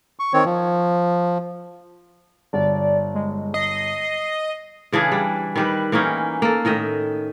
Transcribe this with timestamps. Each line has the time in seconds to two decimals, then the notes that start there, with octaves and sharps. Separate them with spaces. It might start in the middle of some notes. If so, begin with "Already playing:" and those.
0.19 C#6
0.33 D#3 C4 C#5
0.45 F3
2.53 G1 D5
3.14 G#3
3.54 D#5 C7
4.92 C#3 E3 D4 G#4
5.12 G3
5.56 D#3 G3 B4
5.92 E3 A#3 C#4 D#4
6.42 A#3 A4
6.65 A2 D#3 D#5 E5